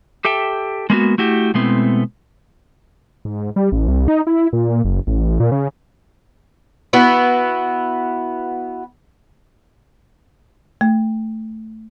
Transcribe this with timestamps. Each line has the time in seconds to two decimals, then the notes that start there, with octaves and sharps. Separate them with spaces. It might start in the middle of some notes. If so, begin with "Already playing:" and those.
0.25 G4 A4 E5 G5
0.90 G#3 A#3 B3 F#4
1.18 A3 E4 F#4 G4
1.54 B2 G#3 A3 B3 C4 E4
3.25 G#2
3.56 G3
3.72 A1
3.88 C2
4.08 D#4
4.27 E4
4.53 A#2
4.85 F#1
5.07 A1
5.40 A#2
5.52 C#3
6.93 B3 E4 F#4
10.81 A3